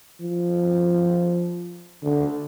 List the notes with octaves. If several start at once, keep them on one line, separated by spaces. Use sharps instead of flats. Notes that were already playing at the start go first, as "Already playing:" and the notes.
F3
D3